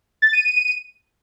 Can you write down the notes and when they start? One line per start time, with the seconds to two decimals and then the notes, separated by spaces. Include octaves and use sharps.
0.22 A6
0.33 D#7
0.45 D#7